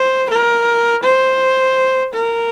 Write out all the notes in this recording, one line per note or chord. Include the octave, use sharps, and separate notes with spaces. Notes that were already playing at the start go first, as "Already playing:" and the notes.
Already playing: C5
A#4
C5
A#4